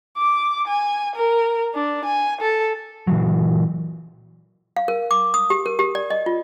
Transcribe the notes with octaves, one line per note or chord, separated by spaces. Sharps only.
D6
G#5
A#4
D4
G#5
A4
A#2 E3 F#3
F5
A#4
D6
D#6
G4
A#4
G4
D5
D#5
F4